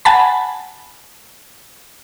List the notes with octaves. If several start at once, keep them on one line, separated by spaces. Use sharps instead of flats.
F#5 G#5 A5 B5